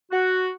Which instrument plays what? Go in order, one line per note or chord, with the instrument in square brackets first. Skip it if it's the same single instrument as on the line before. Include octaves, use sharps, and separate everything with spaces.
[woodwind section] F#4